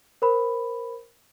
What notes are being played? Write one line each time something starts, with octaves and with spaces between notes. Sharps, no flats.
A#4 C5 B5